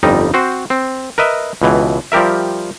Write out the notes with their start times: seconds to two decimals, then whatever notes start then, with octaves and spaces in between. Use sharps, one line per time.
0.03 G1 F2 G3 D#4
0.34 C4 F#4 C5
0.70 C4
1.18 A#4 B4 D#5 E5
1.62 C#2 B2 E3
2.12 F3 G3 G4 A#4 E5